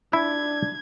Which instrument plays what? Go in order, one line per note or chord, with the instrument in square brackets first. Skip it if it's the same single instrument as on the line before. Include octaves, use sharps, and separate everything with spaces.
[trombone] D4 [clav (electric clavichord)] E4 [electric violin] G#6